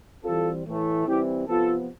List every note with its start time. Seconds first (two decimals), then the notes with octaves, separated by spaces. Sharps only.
0.24 E3 G3 C4 F4 A4
0.66 A2 E3 A3
1.07 E3 G3 C4 E4 G4
1.48 C3 F3 B3 F4 A4